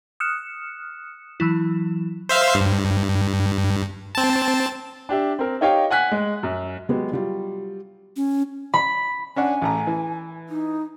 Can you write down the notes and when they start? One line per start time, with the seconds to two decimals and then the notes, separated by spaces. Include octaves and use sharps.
0.20 D#6 F6 F#6 C#7 E7
1.40 E3 F#3 E4
2.29 C5 E5 F5
2.54 G2
4.15 C4 A5
5.09 D4 G4 E5
5.39 C4 A#4
5.61 D#4 G4 C#5 D#5 F5 G5
5.90 F#5 G#5 F#6 B6
6.11 G#3
6.43 F#2
6.89 F#3 G#3 B3 G4
7.12 F#3 G3 F4
8.16 C#4
8.74 B5
9.36 C#4 D4 F#5 G#5
9.62 A1 A3 A#5
9.87 E3
10.49 D#4